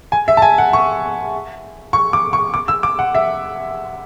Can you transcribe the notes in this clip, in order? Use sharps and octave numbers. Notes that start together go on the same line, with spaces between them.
G#5
E5
A5
G#5
F#5
C#6
C#6
D6
C#6
D6
E6
D6
F#5
E5